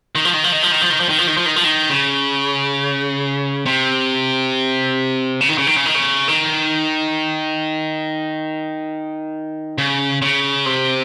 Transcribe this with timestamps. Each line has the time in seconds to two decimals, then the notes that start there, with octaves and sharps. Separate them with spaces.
0.15 D#3
0.25 F3
0.34 D#3
0.44 F3
0.52 D#3
0.63 F3
0.72 D#3
0.81 F3
0.90 D#3
1.00 F3
1.09 D#3
1.18 F3
1.27 D#3
1.37 F3
1.46 D#3
1.56 F3
1.64 D#3
1.90 C#3
3.66 C3
5.41 C#3
5.49 D#3
5.58 C#3
5.67 D#3
5.76 C#3
5.86 D#3
5.95 C#3
6.28 D#3
9.78 C#3
10.22 C#3
10.66 C3